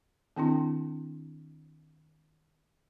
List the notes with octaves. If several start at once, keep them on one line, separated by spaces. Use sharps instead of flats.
D#3 C4 D4 E4